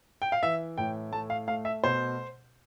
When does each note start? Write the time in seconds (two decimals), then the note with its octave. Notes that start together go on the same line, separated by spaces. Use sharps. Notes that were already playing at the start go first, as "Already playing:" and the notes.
0.22 G5
0.32 F5
0.43 E3 E5
0.78 A2 G5
1.12 A3 A5
1.30 F5
1.47 A3 F5
1.65 E5
1.84 B2 C5